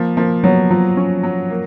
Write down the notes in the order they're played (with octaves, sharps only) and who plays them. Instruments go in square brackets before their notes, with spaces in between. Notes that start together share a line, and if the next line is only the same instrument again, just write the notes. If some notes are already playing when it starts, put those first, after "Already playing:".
Already playing: [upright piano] F3 [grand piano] A#3
[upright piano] F3 [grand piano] A#3
[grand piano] F#3 [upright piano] B3
[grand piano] F3 [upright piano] F#3
[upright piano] C#4
F#3
A#3